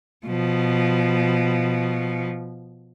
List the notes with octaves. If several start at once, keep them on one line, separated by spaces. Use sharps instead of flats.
B2 F3